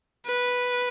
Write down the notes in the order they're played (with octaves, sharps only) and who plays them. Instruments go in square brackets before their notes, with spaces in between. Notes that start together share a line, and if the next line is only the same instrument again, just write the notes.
[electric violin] B4